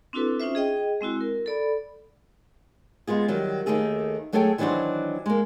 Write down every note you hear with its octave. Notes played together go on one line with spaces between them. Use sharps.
C4 D4 E4 F#4 A4 B4
C#4 D#4 F4 C5 E5
G#4 D#5 G5
G#3 C4 E4 F#4
A#4
A4 D5 B5
G#3 B3 F4 G#4
D#3 F#3 G3
D#2 D#3 A3 G#4 A4
F#3 A3 G#4 A4 C#5 G5
D#3 E3 F#3 D4 F#4 C5
G#3 A#3